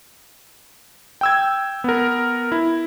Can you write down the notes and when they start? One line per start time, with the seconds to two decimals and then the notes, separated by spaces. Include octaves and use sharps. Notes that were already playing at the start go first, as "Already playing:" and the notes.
1.21 G5 E6 G#6
1.84 B3 A#4
2.52 E4